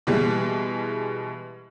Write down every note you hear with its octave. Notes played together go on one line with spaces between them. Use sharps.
B2 E3 G3 G#3